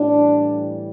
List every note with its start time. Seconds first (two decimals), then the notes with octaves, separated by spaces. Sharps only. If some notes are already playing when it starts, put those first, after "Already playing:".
Already playing: A2 E3 G3 D4